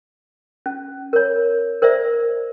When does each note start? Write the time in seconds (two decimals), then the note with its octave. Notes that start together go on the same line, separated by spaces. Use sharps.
0.66 C#4
1.13 A#4 C#5
1.82 A#4 C5 D5 E5